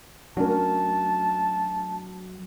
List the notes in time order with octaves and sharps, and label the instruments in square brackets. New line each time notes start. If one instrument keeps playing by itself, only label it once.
[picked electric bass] F#3 [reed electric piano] A3 D4 F#4 [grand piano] C#4 A#4 [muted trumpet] A5